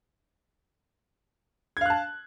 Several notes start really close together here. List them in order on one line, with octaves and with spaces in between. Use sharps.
G#6 F5 F#6 A5